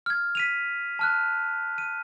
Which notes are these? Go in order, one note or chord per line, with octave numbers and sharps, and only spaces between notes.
F6 G#6
B6 D#7 F7
A5 F6 F#6
D#7